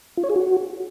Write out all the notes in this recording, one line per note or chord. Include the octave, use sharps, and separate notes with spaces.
F4
C#5
G#4
F#4